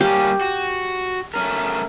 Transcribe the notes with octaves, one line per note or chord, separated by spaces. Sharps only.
G3 A#3 C#4 G4
F#4
A3 C#4 A#4